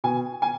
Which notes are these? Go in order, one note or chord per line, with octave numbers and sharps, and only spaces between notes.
B2 G#5
G#5